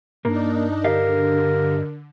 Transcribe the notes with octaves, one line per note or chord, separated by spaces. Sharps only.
G2 A#3 D4 D#4 A#4
D3 G4 A#4 D#5 F5